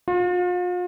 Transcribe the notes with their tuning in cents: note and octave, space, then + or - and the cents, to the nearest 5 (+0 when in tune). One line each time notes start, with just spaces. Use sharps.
F4 +40